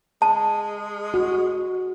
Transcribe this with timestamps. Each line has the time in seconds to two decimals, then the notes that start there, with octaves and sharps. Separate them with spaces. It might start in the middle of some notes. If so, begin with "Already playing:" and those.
0.22 G#3 A5
1.14 F#4